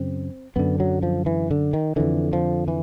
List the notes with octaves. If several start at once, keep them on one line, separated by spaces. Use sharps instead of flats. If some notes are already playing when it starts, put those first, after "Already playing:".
Already playing: F#2 C#3 C4
F#2 D3 B3
F#3
F3
E3
D3
D#3
F2 D3 E3
F3
E3